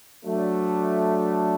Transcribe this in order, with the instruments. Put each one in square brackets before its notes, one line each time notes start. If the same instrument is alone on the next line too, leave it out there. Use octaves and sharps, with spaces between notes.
[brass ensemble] F#3 A3 D4